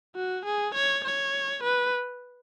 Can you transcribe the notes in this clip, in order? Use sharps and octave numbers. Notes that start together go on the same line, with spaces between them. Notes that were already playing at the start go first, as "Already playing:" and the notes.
F#4
G#4
C#5
C#5
B4